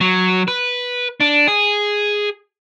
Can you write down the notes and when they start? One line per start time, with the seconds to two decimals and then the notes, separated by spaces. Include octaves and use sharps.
0.01 F#3
0.48 B4
1.20 D4
1.48 G#4